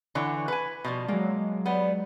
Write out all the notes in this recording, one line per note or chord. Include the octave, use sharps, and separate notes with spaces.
D3 E3 C#5
B4 G#5
B2 F3 G3
F#3 G#3 A#3
G3 B3